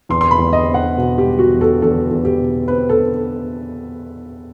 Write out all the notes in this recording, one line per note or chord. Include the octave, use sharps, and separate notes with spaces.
E2 C6
C6
B5
E2
D#5
C4
F#5
B2
G4
G3
F#4
E2
A4
E2 A4
E2
G4
B2
C4 B4
A4